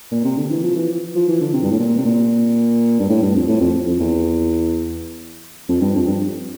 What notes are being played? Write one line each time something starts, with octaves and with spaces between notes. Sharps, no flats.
A#2
C3
D3
E3
F3
E3
F3
E3
D3
C3
G2
A2
A#2
C3
A#2
G2
A2
G2
F2
A2
F2
F2
E2
F2
G2
F2
G2